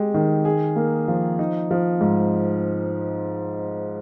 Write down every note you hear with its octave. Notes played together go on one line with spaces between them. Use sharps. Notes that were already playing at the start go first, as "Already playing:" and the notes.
Already playing: G#3 G4
D#3
G#4
A#3
F3
D#4
F3
G#2